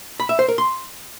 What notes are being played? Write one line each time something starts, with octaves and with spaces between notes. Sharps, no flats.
B5
E5
C5
A#4
C6